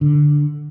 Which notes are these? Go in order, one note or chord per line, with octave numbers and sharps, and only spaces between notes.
D3